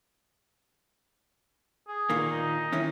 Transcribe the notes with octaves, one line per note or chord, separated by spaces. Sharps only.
G#4
A#2 D#3 A#3
D#4
D#3 E3 C#4